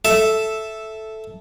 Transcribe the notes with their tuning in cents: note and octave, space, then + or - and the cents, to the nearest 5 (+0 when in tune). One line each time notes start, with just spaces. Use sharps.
A4 -5 E5 +0